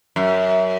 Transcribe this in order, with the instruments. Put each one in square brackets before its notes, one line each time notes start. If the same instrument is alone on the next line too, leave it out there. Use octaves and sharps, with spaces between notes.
[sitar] F#2